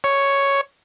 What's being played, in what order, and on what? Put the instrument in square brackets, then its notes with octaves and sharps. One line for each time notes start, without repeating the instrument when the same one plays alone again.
[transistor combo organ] C#5